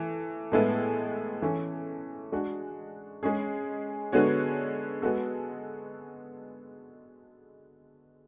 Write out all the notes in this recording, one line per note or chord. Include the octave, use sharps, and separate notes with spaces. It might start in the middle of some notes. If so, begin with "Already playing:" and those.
Already playing: E3 A3
A2 G#3 B3 E4 A4
E3 A3 C#4
G#3 D4 F#4
G#3 C#4 G#4
D3 G#3 B3 F#4 C#5
G#3 B3 F#4 A4